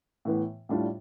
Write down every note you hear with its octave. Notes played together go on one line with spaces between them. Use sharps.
A2 E3 B3
A2 G3 D4 F4